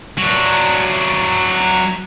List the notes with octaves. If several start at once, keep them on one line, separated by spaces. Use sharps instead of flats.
F#3 D4